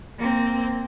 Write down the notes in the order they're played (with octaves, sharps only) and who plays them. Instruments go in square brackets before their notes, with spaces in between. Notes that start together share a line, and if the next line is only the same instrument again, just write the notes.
[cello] A#3 C4